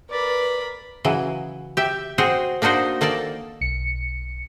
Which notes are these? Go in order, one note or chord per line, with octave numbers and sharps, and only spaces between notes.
A#4 B4 D5 B5
C#3 E3 F#3
G4 E5
C4 F#4 G#4 C5 C#5
A#3 D4 D#4 F#4 C5
D#3 A#3 A4 D5 A5
B1 C#7